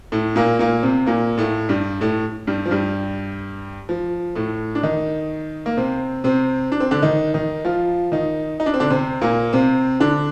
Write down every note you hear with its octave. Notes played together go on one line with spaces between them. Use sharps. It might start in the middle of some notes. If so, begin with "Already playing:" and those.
A2 A3
A#2 A#3
A#2 A#3
C3 C4
A#2 A#3
A2 A3
G2 G3
A2 A3
G2 G3
F3
G2 G3
F3
A2 A3
D4
D#3 D#4
A#3
C3 C4
C3 C4
D4
C4
D3 D4
D#3 D#4
D#3 D#4
F3 F4
D#3 D#4
D#4
D4
C4
D3 D4
C3 C4
A#2 A#3
C3 C4
D3 D4